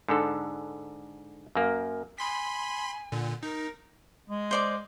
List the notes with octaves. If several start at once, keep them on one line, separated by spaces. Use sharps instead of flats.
G#2 D3 A4
F#2 A#3
G#5 B5 C6 B6
A#2 D3
D#4 A#4
G#3
C5 D5 D6